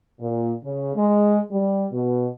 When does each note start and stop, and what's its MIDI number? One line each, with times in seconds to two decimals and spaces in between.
0.21 0.53 46
0.64 0.94 49
0.96 1.39 56
1.51 1.86 55
1.92 2.27 47